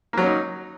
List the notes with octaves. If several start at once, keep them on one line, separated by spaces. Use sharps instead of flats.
F#3 A#3 C#4 D#4